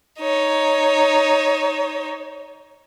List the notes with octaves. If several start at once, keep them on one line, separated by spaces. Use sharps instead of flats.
D#4 C#5